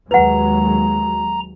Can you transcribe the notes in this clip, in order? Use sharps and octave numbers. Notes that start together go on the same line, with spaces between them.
D#2 F#3 G#3 B4 F#5 A#5